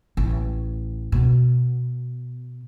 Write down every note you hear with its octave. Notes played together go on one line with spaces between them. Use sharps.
A1
B2